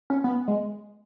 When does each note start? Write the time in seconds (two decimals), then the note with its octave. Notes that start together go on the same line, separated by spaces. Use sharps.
0.10 C#4
0.24 B3
0.48 G#3